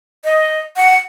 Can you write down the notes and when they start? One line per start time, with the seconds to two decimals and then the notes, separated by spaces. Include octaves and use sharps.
0.24 D#5
0.76 F#5